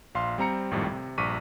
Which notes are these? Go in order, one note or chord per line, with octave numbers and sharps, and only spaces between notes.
A#1 F5 C6
G3 C4 A#5 C#7
G#1 F2 A2 D#3 G3
C3
A#1 G2 C#6 D6 B6 D#7